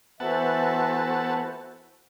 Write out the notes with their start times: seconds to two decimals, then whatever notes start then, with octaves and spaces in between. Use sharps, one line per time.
0.20 E3 B3 F#4 A4 C5 E5 F#5 A5